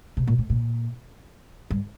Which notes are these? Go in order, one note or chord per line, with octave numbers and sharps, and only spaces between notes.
C3
A#2
A2
A#2
G2